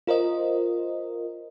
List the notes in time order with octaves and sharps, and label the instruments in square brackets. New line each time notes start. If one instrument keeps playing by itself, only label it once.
[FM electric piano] F4 A#4 C5 D#5